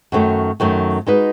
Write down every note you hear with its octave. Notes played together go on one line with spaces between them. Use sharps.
F#2 D#3 F#3 A3
F#2 D#3 F#3 A3
G#3 D#4 F#4 B4 D#5